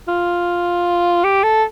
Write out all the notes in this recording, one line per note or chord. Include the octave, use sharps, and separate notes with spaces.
F4
G4
A4